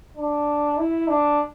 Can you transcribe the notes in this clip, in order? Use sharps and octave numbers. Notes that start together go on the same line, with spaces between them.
D4
E4
D4